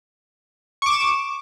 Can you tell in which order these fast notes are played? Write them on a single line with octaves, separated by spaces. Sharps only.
C#6 D6 E7